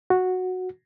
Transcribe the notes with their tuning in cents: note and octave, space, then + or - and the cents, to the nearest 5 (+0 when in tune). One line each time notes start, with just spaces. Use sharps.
F#4 -10